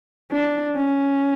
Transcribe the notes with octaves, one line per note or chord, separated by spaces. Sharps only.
D4
C#4